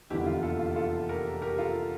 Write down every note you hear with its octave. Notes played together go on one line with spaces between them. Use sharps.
F1 E2 D3 G3 A#3 E4 G4
F4
F4 A4
F4
F4 A4
G4 A#4
G4 A#4
F4 A4